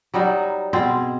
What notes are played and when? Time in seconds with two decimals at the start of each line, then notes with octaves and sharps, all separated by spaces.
0.14 F#3 G3 D#4
0.73 B2 C4 G#4 C5